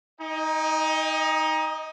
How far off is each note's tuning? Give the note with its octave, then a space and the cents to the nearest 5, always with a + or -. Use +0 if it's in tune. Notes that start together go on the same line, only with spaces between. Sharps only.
D#4 +20 D#5 -15 G5 +45